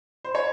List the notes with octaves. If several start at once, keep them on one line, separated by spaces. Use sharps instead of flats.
C5
C#5